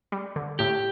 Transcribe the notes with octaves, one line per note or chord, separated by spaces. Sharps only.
G3
D3
A2 G4